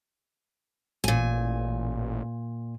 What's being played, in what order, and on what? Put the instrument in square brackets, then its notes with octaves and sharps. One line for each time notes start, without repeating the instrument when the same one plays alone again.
[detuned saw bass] A1 [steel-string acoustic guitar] A#2 G#5